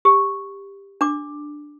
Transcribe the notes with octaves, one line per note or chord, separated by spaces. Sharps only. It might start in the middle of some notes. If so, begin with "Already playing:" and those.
G4
D4 D6